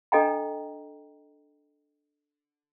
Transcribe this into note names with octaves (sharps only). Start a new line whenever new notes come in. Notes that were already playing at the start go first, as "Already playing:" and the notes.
D4 A4 D#5 G5 A#5